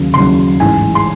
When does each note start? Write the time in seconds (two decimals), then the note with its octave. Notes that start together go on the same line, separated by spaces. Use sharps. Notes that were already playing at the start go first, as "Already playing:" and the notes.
Already playing: D#2 C#3 F#3
0.14 D#2 C#3 F#3 C6
0.59 A1 G#2 E3 G#5
0.95 C6